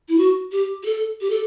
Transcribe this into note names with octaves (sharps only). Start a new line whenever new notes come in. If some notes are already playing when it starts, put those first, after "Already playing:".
E4
F#4
G4
G4
A4
G4
A4